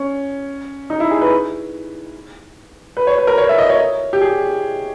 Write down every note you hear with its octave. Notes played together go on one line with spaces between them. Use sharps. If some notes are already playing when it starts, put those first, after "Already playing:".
Already playing: C#4
D#4
E4
G#4
B4
B4
C#5
B4
A#4
C#5
E5
D#5
C#5
G4
G#4